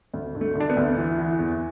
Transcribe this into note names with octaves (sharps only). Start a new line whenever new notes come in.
D2
D3
A3
D3 D4
B3
D2
E3
E3
E2